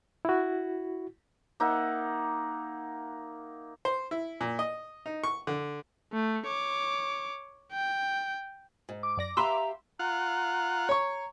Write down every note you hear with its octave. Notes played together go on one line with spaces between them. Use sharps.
E4 F#4
A#3 D#4 E5 F#5
C5
E4
A#2
D#5
D#4
C#6
D3
A3
C#5 D6
G5
G#2
D6
F#2 D5 A#6
G4 B4 E5 F5 A#5 C6 E6
F4 F#5 A#5
C#5 C#6